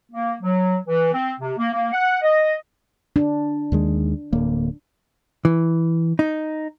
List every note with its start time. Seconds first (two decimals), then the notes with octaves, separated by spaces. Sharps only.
0.12 A#3
0.42 F#3
0.87 E3
1.13 C4
1.40 C3
1.57 A#3
1.72 A#3
1.92 F#5
2.22 D#5
3.16 D4
3.72 D#2 D#3 G#3
4.32 D1 A#3
5.45 E3
6.19 D#4